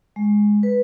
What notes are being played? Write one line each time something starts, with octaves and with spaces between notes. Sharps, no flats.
G#3
B4